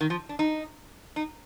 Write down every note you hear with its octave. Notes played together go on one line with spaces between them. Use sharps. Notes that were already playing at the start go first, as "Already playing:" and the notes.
D#3
F3
D4
D#4
D#4